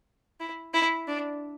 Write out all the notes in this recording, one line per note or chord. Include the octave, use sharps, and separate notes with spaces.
E4
E4
D4